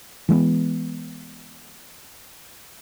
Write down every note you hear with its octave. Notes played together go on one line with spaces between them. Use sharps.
E3 G#3 A3 B3